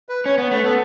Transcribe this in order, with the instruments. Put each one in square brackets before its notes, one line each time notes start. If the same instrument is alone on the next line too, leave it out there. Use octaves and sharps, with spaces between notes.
[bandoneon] B4
[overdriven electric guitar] C#4 [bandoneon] C#5
[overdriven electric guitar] B3
[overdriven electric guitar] A3 [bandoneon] B4
[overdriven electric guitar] B3 [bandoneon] A4